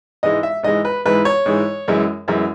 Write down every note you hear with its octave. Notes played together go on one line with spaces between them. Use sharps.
G#2 E3 G#3 D#5
E5
G#2 E3 G#3 D#5
B4
G#2 E3 G#3 B4
C#5
G#2 E3 G#3
F#2 E3 G#3
F#2 E3 G#3